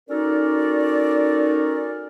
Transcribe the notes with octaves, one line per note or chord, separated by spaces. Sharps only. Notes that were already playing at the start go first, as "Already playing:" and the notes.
C#4 D#4 F#4 A4 A#4 D5